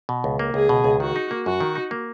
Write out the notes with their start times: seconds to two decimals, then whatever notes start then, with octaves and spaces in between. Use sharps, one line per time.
0.09 B2
0.24 C#2
0.39 A#3
0.54 C#2 G#4
0.69 B2
0.84 C#2
1.00 D#3 F#4
1.16 D#4
1.31 A#3
1.45 F#2 F#4
1.61 D#3
1.75 D#4
1.91 A#3